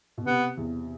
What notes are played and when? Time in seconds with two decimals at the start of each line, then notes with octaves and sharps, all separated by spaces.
0.18 B2
0.25 C3 B3
0.57 E2